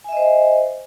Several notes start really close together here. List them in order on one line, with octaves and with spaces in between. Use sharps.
G#5 E5 D#5 C5